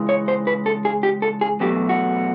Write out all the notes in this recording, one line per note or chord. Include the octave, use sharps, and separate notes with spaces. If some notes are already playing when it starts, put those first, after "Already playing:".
Already playing: C#3 E3 G#3
C#5
C5
B4
A4
G#4
G4
A4
G#4
E2 B2 F#3 A3 G4
F#4